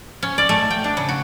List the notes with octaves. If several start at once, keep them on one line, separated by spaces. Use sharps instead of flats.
C#4
D5
A3
G5
D4
C#3
F#4